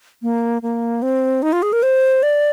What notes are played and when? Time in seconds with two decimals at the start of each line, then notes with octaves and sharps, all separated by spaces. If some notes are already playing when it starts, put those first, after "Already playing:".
0.22 A#3
0.62 A#3
1.02 C4
1.42 D#4
1.53 F4
1.62 G#4
1.73 A#4
1.83 C5
2.23 D5